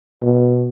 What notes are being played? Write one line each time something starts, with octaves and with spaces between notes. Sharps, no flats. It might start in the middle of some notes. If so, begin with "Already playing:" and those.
B2